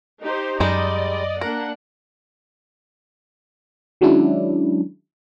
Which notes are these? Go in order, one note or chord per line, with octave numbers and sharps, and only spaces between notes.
D#4 G4 C5
F#2 G3 G#3 D#4 D5 D#5
A#3 D4 A#4 F#5
D#3 F#3 G#3 C#4 D4 E4